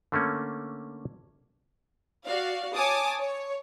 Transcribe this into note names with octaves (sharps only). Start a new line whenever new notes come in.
D3 A3 A#3 C#4
F#4 D5 F5
C#5 G#5 A5 D6 D#6
C#5